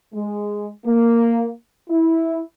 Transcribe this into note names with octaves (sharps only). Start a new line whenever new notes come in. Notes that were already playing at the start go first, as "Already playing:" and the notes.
G#3
A#3
E4